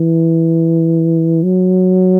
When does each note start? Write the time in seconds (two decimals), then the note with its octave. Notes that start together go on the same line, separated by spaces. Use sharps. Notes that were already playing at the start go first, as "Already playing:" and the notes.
Already playing: E3
1.43 F#3